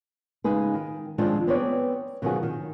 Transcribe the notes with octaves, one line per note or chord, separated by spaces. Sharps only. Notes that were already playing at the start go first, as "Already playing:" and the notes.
C#3 G#3 D#4 G#4 B4
D#3
D#3 F3 G#3 C4 D4
B3 C4 G#4 B4 C#5 D5
B2 D#3 F3 F#3 F#4 G#4
D#3